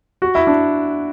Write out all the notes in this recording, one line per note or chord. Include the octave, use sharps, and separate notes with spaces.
F#4
E4
D4